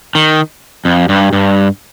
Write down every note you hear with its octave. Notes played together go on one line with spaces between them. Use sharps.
D#3
F2
G2
G2